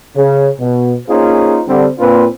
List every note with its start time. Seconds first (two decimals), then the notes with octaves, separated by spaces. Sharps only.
0.16 C#3
0.60 B2
1.08 A#3 C#4 D#4 F4 G#4 C5
1.68 D3 G3 C4
1.99 A#2 A#3 C4 D4 F4 B4